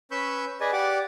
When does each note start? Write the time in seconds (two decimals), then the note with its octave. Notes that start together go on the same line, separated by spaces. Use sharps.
0.11 C#4 B4 B5 C#6 E6 G6
0.60 G#4 B4 D5 D#5 G#5
0.73 G4 D5 F#5 D6